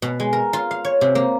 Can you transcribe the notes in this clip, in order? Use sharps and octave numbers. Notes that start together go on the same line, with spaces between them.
B2
G#3
A#4
F4
F5
C#5
C3
A#3